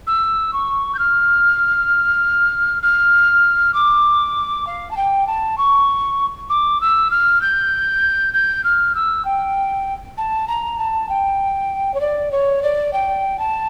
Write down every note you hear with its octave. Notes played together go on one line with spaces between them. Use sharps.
E6
C#6
G6
F6
F6
D6
F5
A5
G5
A5
C#6
D6
E6
F6
G6
G6
F6
E6
G5
A5
A#5
A5
G5
C#5
D5
C#5
D5
G5
A5